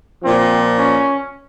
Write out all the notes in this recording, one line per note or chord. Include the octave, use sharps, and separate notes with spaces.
A#2 F3 C4
C#4